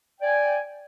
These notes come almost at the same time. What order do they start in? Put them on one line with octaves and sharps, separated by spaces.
G5 D5 G#5